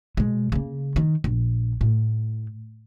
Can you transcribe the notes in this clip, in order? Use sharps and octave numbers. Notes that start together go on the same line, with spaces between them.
B2 G#3
C#3 A#3
D#3
A#1
A2